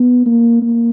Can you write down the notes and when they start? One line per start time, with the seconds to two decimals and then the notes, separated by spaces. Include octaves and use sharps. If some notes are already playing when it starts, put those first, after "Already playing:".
Already playing: B3
0.26 A#3
0.62 A#3